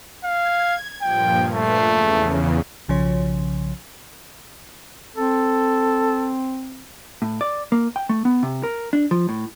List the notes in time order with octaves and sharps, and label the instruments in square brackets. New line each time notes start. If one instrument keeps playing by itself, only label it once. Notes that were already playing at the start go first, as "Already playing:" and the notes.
[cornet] F5 [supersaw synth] G#6
[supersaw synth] G2 A#2 F3 [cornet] G5
[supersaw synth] A#2 B4 C7 [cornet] A3
[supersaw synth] E2 C#3
[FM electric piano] B1 C#3 F3 C#5
[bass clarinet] C4 [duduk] A4
[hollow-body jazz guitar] A2
D5
A#3
G5
A3
B3
C3
A#4
D4
F3
A2